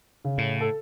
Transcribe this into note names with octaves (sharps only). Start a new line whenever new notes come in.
C#3
A2
A4